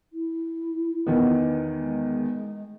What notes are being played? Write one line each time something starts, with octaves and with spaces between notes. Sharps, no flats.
E4
E2 D#3 B3
G#3